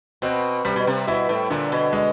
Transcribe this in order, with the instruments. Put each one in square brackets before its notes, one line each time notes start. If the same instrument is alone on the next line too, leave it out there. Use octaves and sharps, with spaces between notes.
[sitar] B2 [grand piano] C4
[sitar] C3 [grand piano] G3
[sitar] B2
C3
[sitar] B2 [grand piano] E4
[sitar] A2
[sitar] A#2 [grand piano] D3
[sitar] B2
[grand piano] G#3